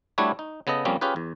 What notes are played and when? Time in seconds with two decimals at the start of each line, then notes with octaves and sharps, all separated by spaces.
0.18 G3 A3 D4 E4 F#4 C#5
0.39 D#4
0.67 C#3 B3 A4 D#5
0.85 F2 G3 A#3 C4 C#4
1.01 C#4 F4 G4 G#4 B4
1.16 E2